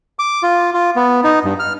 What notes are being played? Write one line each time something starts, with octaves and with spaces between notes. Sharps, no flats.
D6
F4
F4
B3
D#4
G2
F6